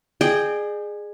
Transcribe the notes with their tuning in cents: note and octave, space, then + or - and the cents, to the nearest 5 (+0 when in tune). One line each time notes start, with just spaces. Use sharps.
G#4 +0 D5 +45 G5 +0